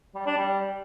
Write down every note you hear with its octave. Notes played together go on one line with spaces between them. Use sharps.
G3
D4
G3